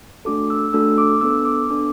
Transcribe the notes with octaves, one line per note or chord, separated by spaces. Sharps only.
A3 D4 F#4 A4 D6
E6
A3 D4 F#4 A4 E6
D6
B3 D4 A4 E6
D6
B3 D4 A4 D6